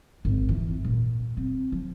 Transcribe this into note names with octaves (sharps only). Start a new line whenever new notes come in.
G#1
F2 E3
A#2
C4
F3